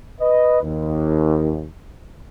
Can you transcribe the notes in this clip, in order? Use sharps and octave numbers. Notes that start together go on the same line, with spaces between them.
B4 D#5
D#2